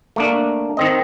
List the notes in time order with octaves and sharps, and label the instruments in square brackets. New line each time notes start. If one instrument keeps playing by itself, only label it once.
[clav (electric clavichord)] A3 A#3 D4
D#3 C4 D#5